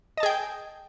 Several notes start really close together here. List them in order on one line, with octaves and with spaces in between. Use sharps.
D#5 A5 G#4 G5